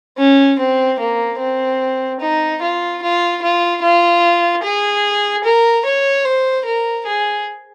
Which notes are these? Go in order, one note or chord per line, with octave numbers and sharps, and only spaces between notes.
C#4
C4
A#3
C4
D#4
F4
F4
F4
F4
G#4
A#4
C#5
C5
A#4
G#4